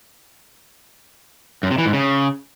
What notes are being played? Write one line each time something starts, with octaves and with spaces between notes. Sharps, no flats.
F#2
C3
E3
G#2
C#3